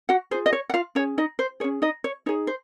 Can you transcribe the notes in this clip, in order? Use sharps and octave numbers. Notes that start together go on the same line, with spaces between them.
F#4 F#5
F4 G#4 C5
D#5
C#5
F#5
F4 F5
C#4 G#4 C#5
D#4 D#5
C5
C#4 G#4 C#5
D#4 D#5
C#5
D#4 G#4 C#5
C5